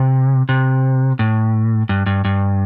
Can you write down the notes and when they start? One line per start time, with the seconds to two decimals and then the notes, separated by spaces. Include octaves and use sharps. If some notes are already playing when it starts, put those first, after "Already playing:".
Already playing: C3
0.49 C3
1.19 A2
1.89 G2
2.06 G2
2.25 G2